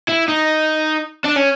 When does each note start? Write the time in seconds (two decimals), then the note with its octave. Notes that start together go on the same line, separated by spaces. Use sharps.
0.08 E4
0.28 D#4
1.25 D4
1.37 C#4